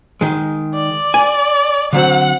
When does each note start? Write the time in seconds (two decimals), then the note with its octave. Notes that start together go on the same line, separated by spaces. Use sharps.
0.21 D#3 G#3
0.75 D5
1.14 G#5
1.93 D3 F#3 C4 F#5